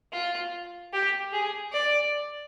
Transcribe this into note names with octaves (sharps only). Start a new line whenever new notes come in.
F4
G4
G#4
D5